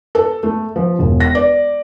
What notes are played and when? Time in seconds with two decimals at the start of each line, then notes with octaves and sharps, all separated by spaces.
0.15 A4
0.43 A3
0.76 F3
0.99 E1
1.20 A#6
1.35 D5